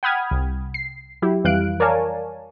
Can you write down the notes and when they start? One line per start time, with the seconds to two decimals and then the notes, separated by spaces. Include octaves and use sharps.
0.03 F#5 G5 B5 D#6 F6 G#6
0.31 C2
0.74 C7
1.22 F#3 E4 G4
1.44 F2 E3 G3 F5 F#6 D7
1.80 A#4 C#5 D5 F5 G#5 A5